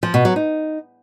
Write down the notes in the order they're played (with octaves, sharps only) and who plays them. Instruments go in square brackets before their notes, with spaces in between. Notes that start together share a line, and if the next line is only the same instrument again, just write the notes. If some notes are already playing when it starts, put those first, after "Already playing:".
[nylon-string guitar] F3
B2
F#3
D#4